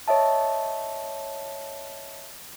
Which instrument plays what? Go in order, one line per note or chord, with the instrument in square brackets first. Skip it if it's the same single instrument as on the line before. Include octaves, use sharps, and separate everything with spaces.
[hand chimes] C#5 D#5 E5 A5